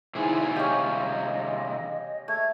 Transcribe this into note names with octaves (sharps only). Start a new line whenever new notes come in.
C3 E3 D#4 E4 G#4 C5
C#4 G4 D#5 F5
A3 G#6